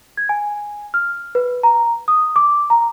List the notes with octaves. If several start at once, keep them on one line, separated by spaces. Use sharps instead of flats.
G#6
G#5
F6
B4
A#5
D#6
D6
A#5